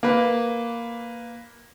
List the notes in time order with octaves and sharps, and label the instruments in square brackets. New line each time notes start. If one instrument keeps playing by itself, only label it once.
[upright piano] A#3 B4